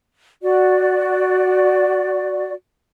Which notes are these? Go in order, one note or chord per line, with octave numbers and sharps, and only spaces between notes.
F#4 D5